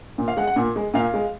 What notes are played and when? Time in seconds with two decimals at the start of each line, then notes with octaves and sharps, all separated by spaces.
0.18 A#2
0.28 F5
0.37 G#3 F#5
0.47 F#5
0.56 A#2
0.76 G#3
0.94 A#2 F5
1.14 G#3